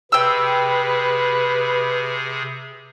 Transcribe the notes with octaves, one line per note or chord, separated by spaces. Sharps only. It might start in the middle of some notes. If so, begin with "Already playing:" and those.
C3 G#4 B4 G5 E6